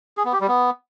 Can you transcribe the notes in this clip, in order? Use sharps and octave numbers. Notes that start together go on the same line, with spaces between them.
G#4
B3
G4
G3
B3